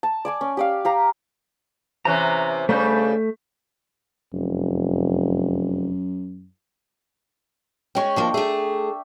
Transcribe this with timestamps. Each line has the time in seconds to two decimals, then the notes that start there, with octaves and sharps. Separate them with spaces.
0.03 A5
0.25 D5 G#5 D6
0.41 C#4
0.57 G4 D5 F5
0.85 G4 F5 A#5
2.05 C3 E3 C#4 A#5 F#6
2.69 G2 C#3 G3 A3 G6
4.33 F1 F#2
7.95 G#3 C#4 G5 C#6
8.16 D#2 F3 A#3 D4
8.34 A3 G#4 E5